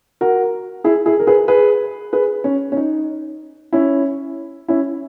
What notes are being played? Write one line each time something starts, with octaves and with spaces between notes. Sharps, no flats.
F#4 A#4
E4 G#4
E4 G#4
A#4
G#4 B4
G#4 B4
G#4 B4
C#4
C#4
D#4
C#4 E4
C#4 E4